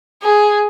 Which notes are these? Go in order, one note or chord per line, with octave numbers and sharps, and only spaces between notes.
G#4